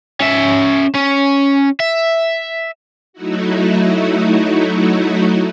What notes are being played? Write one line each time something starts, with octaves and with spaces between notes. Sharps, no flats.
C#4 E5
C#4
E5
F#3 A3 D#4 E4 F#4